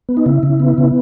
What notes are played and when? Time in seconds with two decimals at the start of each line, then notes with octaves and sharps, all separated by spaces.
0.09 B3
0.17 D#4
0.26 C#3 E4
0.43 C#3
0.60 B3
0.78 C#3